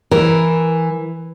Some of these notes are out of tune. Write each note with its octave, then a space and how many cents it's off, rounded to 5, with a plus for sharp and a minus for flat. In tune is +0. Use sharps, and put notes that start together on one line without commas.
E3 +5 A#4 +10